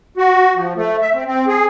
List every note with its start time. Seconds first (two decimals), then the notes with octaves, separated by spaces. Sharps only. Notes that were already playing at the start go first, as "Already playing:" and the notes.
0.17 F#4
0.55 F3
0.76 A3
1.01 E5
1.14 C4
1.26 C4
1.48 G#4